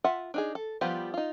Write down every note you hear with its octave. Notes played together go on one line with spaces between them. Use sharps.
F4 E5 F#5
D4 D#4 G#4
A4
F3 G3 B3 F4 G4
D#4 F4